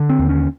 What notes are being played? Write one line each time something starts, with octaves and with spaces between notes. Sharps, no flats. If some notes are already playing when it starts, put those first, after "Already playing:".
Already playing: D3
C4
D#2
C#4